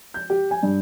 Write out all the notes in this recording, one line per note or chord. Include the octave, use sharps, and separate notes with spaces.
G6
G4
G#5
G2